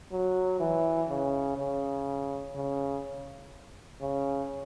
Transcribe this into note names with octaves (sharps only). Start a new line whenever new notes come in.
F#3
E3
C#3
C#3
C#3
C#3